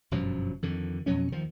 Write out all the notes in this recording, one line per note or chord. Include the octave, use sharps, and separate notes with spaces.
G1 F#2 B2 F3
F2 D3 D#3
F2 B2 F#3 C#4
D#2 D#3 F3